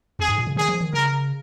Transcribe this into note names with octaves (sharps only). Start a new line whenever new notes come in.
F2 G#4
G#2
A#2
C#3
D#3 G#4
F3
D#3
C#3 A#4